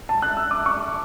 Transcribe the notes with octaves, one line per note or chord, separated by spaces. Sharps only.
A5
F#6
E6
D6
C#6